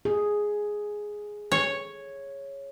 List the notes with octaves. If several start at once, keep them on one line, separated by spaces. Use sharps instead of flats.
G#4
C#5